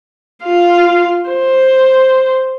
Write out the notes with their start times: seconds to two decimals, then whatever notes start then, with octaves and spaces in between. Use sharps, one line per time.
0.44 F4 F5
1.30 C5